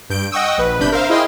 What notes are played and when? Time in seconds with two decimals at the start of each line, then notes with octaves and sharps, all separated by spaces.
0.10 G2 G6 D7
0.32 D#5 F#5 G5 C#6 D#6 E6
0.58 A#1 B4
0.80 G1 C3 D4 B5 G6
0.92 A#4 C5 E5 F5
1.10 E4 G#4 D#5 F5 G5 C6